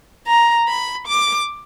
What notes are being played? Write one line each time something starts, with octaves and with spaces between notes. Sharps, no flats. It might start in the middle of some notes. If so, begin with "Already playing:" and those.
A#5
B5
D6